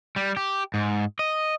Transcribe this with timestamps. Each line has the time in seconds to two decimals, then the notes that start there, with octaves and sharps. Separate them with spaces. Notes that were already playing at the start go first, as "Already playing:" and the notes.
0.16 G3
0.37 G4
0.74 G#2
1.19 D#5